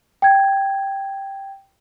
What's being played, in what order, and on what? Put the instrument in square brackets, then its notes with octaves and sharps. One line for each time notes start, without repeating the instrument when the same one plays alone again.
[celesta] G5 G#6